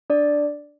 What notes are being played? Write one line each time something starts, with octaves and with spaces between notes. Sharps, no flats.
D4 D5